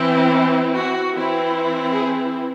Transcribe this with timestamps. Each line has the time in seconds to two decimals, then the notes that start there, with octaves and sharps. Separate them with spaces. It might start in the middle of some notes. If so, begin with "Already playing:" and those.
Already playing: E3 C4 E4
0.76 F#4
1.15 E3 C4 E4
1.93 G#4